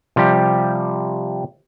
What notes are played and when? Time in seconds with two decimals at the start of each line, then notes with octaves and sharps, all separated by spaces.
0.16 C3 F3 G3 G4